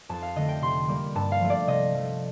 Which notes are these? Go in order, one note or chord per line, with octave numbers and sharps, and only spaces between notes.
F2 A5
F5
D3 A3 D#5
G5
C3 C6
G3 A#3
G2 A5
F5
F3 A3
D5
C3 D#5
F3 A3